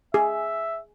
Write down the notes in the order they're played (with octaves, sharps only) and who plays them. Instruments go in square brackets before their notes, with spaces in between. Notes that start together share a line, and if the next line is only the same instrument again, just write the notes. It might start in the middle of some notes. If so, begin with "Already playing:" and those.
[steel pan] G#4 [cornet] E5